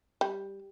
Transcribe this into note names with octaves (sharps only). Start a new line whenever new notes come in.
G3